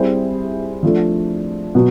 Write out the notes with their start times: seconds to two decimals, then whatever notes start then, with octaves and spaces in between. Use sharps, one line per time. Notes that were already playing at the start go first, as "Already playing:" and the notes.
Already playing: G3 C4 E4 G#4 C5
0.83 F3 A3 D4
1.75 B2 F#3